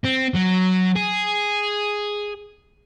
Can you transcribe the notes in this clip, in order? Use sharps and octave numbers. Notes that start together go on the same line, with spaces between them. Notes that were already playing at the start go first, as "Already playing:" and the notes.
C4
F#3
G#4